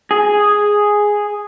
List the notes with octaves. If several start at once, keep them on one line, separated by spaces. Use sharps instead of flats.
G#4